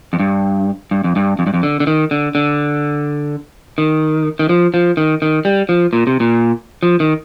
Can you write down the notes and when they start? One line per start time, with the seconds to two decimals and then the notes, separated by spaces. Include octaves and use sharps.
0.13 F2
0.20 G2
0.91 G2
1.04 F2
1.16 G2
1.39 F2
1.47 G2
1.54 F2
1.63 D3
1.80 D3
1.87 D#3
2.11 D3
2.35 D3
3.78 D#3
4.39 D#3
4.49 F3
4.74 F3
4.97 D#3
5.22 D#3
5.45 G3
5.69 F3
5.93 A#2
6.07 C3
6.20 A#2
6.83 F3
7.00 D#3